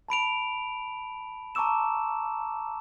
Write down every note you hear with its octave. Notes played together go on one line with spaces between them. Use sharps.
A5 B5 D7 F7
A5 A#5 C#6 D6 E6 E7